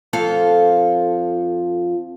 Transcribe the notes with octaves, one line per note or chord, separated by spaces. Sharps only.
F2 F4 A4